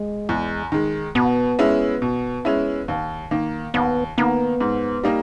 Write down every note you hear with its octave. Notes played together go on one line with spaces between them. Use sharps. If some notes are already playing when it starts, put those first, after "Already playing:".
Already playing: G#3
E2
D#3 G#3
B2 B3
G#3 C#4 E4
B2
G#3 C#4 E4
D#2
D#3 A#3
D#2 B3
D#3 A#3 B3
G#2
G3 A#3 D#4